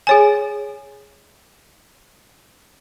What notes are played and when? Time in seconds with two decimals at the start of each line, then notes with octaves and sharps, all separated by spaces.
0.07 G#4 C#5 G#5